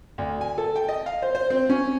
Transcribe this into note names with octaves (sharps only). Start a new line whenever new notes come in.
D2
G#5
A4
G5
D#5
F5
C5
C5
C4
C#4